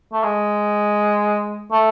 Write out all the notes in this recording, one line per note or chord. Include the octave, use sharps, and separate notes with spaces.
A3
G#3
A3